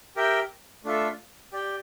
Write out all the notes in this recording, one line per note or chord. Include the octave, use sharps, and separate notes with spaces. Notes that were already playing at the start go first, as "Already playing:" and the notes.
G4 A#4 E5 G5
A3 D4 F4 A4 E5
G4 D5 G5